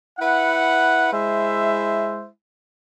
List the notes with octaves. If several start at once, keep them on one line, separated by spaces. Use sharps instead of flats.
E4 B4 F#5
G#3 E4 C5 E5